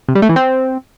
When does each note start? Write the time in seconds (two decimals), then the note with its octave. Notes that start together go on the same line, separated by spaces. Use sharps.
0.08 C3
0.15 G3
0.22 A3
0.29 E3
0.36 C4